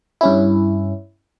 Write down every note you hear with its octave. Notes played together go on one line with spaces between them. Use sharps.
G2 C#4 E4